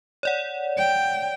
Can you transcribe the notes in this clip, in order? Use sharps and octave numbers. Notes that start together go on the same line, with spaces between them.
C#5 D5 F#5
G5